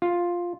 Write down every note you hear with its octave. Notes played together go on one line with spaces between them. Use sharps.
F4